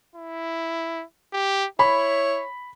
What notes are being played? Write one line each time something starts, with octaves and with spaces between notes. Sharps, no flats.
E4
G4
E4 C#5 B5